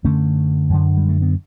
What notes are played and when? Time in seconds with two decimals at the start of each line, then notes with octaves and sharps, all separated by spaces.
0.04 F#2 D3 A3 C#4
0.70 F#2 D3
0.97 G3
1.09 A3
1.22 B3